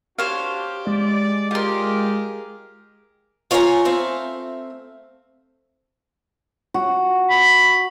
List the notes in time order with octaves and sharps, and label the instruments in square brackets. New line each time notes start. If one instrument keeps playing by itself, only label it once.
[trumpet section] D4 F#4 [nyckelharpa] G4 [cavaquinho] C5 C#5 F5
[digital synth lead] G#3 [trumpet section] D5
[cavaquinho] F4 C6 [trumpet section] G4 [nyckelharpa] G#4 A#4
[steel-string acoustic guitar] F4 C#5 F5 G5 G#5 A#5
A3 C4 E5 F5
[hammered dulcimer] F#4
[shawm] B5